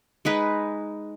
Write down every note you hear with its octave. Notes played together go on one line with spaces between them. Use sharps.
G#3 D#4 G#4 B4